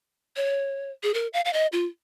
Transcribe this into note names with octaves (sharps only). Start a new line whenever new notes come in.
C#5
G#4
A#4
F5
F5
D#5
F4